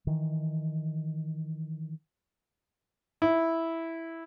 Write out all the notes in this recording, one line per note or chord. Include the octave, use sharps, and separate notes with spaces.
D#3 E3
E4